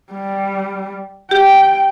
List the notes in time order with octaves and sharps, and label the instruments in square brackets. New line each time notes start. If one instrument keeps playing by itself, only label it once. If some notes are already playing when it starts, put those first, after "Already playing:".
[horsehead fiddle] G3
[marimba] G4 [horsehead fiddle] G5